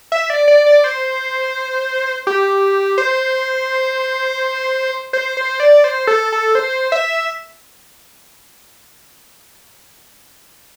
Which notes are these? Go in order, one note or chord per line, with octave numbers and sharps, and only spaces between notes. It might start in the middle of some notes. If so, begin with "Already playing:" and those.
E5
D5
D5
D5
C5
G4
C5
C5
C5
D5
C5
A4
A4
C5
E5